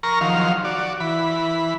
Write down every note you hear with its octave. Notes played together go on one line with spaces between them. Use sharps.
A#4 A#5 C#6 F6
D#3 F3 F#3 F5
F#4 D5
E3 B5